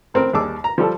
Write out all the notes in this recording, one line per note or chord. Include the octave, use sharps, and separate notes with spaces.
A1 C4 A#4
D#2 G3 G#4 A5 D6 E6
A#5
F3 G3 A4